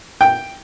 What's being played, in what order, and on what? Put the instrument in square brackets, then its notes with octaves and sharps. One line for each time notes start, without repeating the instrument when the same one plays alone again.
[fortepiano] G5